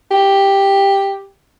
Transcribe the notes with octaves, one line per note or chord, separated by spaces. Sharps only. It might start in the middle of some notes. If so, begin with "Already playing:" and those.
G4